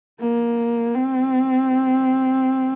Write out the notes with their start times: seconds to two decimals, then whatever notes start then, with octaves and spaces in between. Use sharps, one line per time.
0.20 A#3
0.95 C4